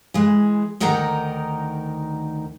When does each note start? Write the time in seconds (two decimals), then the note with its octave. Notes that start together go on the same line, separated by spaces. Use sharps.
0.14 E3 G#3
0.80 D2 D#3 D#4 A#4 F#5 A#5